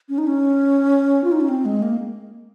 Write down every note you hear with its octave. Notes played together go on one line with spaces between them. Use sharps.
C#4
D#4
C#4
F4
D#4
C#4
C4
G#3
A#3